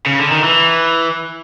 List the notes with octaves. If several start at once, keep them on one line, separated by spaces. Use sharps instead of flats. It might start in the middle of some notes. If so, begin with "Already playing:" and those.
C#3
D3
D#3
E3